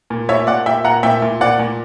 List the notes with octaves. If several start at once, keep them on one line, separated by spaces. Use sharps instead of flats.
A#2
A#2 C#5 E5
A#2 D5 F#5
A#2 E5 G5
A#2 F#5 A#5
A#2 E5 G5
A#2
A#2 D5 F#5
A#2